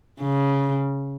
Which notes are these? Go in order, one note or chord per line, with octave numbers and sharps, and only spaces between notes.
C#3